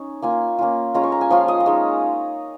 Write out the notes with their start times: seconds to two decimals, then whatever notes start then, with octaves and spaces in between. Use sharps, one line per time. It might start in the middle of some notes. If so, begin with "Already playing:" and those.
Already playing: C#4 D#4
0.22 A#3 F4 G#5
0.59 A#3 C#4 F4
0.94 G#3 C#4 F4 A#5
1.03 C#6
1.12 A#5
1.21 G#5
1.30 F3 C#4 F4 F5
1.48 D#5
1.60 D#5
1.66 G#3 D#4 C#5